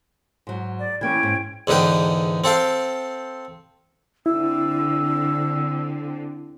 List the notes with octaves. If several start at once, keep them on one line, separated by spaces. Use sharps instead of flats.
G#2 F#3
D5
E3 A#3 C#4 G5 G#6
G#2
E2 G#2 D3 B4 G5
C4 A4 F5 G5
D3 C4 E4 E6